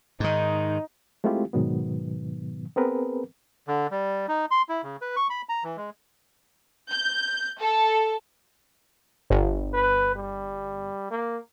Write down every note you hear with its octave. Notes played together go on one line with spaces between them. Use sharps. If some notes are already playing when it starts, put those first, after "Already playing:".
G#2 D#3 D#4
G#3 A3 C4 E4 F4 G4
G#2 B2 D#3 F#3 B3
B3 C4 G#4 A#4 B4
D3
G3
D#4
C6
E4
C#3
B4
C#6
B5
A#5
E3
G#3
G6
A4
G1
B4
G3
A#3